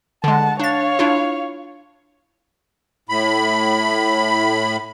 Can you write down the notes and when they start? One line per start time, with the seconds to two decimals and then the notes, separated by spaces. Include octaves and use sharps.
0.24 D3 G#3 F#5 A5
0.60 D4 C#5 F5 A6
0.99 D4 E4 F4
3.09 A2 B5